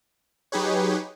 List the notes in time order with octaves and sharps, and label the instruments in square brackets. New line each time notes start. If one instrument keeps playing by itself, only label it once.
[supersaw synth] F#3 D#4 G4 G#4 B4 C#5